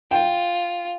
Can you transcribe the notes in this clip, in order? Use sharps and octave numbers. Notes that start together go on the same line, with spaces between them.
F4 G5